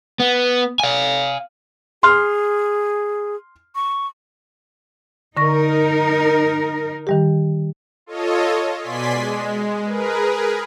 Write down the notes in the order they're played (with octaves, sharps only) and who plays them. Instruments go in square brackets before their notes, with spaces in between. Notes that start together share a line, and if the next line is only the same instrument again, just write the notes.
[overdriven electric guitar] B3
F5 G#5
[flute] G#4 [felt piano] C6 F6
[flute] C#6
[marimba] D3 C#6 A#6 [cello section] D#4 A#4
[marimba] D#3 G3 G4
[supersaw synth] F4 A4 C#5 D#5
B2 D5 G#5 C6 B6
G#3
G#4 A#4 B4